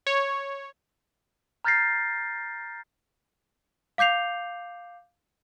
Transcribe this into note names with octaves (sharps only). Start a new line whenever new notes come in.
C#5
A#5 F6 G6 A6 A#6 C7
F5 D6 G6 C7 F7